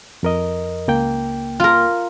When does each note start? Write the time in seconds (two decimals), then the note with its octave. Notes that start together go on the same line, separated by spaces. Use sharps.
0.23 F2 A#4 D#5
0.88 C#2 A#3 G5
1.60 F4 A#4